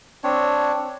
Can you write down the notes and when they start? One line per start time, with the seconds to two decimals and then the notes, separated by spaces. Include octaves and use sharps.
0.24 C4 D4 C#5